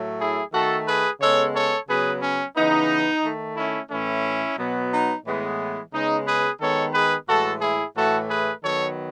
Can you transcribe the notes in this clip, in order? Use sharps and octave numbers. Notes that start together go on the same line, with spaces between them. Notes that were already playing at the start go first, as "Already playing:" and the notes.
Already playing: A2 F#3 A3
E4 G#4
D#3 A3 F#4 A4
G#4 B4
C#3 G#3 B3 A4 C#5
A4 C#5
C#3 F#3 B3 G#4 B4
C#4
C#3 E3 B3 D#4
D#3 A3
C#4 E4
A2 E3 A3 C#4 E4
B2 F#3 B3
D#4
A2 E3 G#3 B3
C#3 G#3 B3 D#4
G#4 B4
D#3 G#3 B3 A4 C#5
G#4 B4
A2 E3 G#3 F#4 A4
E4 G#4
A2 E3 A3 F#4 A4
G#4 B4
D#3 F#3 B3 A4 C#5